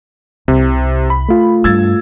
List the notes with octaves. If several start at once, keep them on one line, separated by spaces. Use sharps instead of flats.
C2 C3
B5
A3 F4
G2 E6 G#6 A6